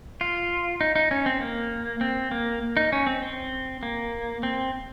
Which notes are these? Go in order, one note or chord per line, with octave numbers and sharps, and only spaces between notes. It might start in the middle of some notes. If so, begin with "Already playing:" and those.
F4
D#4
D#4
C#4
C4
A#3
C4
A#3
D#4
C#4
C4
C4
A#3
C4